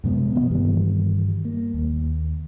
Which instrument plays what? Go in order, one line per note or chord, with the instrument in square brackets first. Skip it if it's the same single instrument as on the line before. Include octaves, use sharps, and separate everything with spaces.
[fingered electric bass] F#2 C3 G#3 B3
B2 E3 A#3 B3
G2 D#3 E3 G3
A#3
D#2